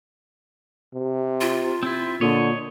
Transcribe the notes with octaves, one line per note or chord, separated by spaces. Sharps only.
C3
F4
C4 E4
A#2 D3 C#5 D#5